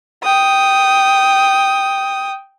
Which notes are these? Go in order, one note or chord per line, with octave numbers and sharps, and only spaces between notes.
G5 D#6